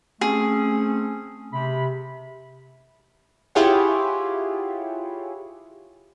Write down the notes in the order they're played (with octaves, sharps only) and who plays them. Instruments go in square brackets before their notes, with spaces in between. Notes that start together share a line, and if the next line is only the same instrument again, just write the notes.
[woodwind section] A3 C4 C#4 [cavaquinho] G#4
[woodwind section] C3 B5
[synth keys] E4 F4 G4 G#4 C#5 F#5